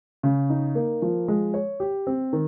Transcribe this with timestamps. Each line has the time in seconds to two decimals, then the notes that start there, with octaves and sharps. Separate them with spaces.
0.23 C#3
0.50 D#4
0.75 A#3
1.02 F3
1.28 G#3
1.54 C#5
1.80 G4
2.07 C4
2.33 D#3